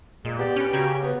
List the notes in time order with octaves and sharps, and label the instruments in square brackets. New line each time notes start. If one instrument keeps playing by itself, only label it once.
[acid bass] A#2 [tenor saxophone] G#3
[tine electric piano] B3 D5 [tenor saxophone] G4
[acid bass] C#4 [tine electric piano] B4 G5
[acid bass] C#3 [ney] F#4 [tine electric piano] G5 A#5 G#6
[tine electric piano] B3 [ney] B4